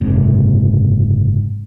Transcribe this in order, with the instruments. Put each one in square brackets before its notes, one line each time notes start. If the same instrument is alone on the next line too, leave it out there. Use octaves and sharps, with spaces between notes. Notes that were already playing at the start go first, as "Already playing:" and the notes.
[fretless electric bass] F#1 G#2 C3